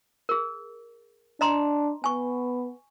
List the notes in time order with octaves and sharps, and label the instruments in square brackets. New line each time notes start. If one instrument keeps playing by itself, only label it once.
[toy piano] G#4 A#4
[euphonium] D4 [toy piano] D#5 A#5 C6
[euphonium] B3 [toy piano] G#5 C#6